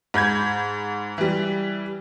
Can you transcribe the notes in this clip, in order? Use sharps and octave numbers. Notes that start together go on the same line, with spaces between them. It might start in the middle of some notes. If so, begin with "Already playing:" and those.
G#2 B5 G6 G#6
E3 G3